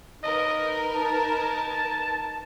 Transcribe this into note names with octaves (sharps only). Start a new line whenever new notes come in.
D#4 A#4 B4 D#5
A5